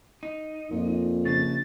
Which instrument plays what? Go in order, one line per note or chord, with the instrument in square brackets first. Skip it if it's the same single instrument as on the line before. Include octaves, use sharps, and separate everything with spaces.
[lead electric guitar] D#4
[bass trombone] F2 [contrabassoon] A#2
[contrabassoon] A#1 [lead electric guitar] C#3 [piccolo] A6